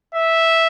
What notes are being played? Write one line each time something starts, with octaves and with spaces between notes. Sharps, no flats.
E5